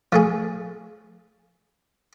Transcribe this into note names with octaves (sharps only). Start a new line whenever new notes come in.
F3 A3 G#4